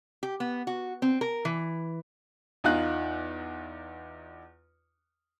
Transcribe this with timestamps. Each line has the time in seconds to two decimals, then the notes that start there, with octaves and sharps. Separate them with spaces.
0.23 G4
0.40 B3
0.67 F#4
1.02 C4
1.21 A#4
1.45 E3
2.64 E2 D#4 F4 F#6